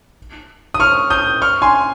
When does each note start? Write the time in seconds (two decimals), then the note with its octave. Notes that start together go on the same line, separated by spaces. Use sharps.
0.74 D#6
0.80 C#6 F6
1.10 D#6 G6
1.42 C#6 F6
1.62 G#5 C6